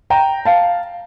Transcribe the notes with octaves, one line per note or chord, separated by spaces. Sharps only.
G5 A#5
F5 A5